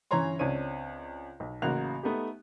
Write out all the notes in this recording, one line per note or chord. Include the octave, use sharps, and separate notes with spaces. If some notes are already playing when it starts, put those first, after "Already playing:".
G1 E3 C#4 C#5 A#5 C6
C#2 C4 D4 C#5 D#7
B1
A1 C#3 A#3 F#4 F#6 F7
A3 B3 D#4 G4